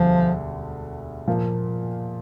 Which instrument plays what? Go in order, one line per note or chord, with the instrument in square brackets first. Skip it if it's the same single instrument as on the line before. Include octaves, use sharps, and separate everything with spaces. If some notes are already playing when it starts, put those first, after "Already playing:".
Already playing: [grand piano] E1 D2 D3 G3 [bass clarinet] F3
[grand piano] A#2 F3 A#3